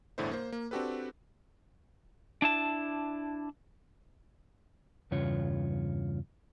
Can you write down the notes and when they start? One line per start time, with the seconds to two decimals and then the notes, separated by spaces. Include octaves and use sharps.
0.18 G1 E2 A2 D3 E4 C5
0.31 A#3 C5
0.52 A#3
0.71 C4 D4 F#4 G4 A4 B4
2.42 D4 E4 A5
5.11 E2 G2 C#3 F4 C#5